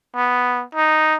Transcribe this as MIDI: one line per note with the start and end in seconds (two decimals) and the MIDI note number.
0.16 0.64 59
0.75 1.16 63